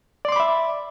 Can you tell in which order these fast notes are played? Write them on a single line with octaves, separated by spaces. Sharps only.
D5 C6 D6 B5 E5